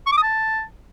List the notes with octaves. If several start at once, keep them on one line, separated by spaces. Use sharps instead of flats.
C#6
D6
D#6
A5